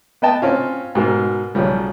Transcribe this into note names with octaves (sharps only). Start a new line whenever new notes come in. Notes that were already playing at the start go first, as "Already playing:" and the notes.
B3 B4 D#5 G5 A5
C4 C#4 F4
G#2 B2 A#4
B1 C#3 F3 G3